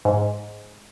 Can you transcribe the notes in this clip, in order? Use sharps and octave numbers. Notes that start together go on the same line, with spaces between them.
G#2